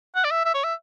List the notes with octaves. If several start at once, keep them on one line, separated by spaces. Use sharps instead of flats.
F#5
D5
E5
E5
C#5
E5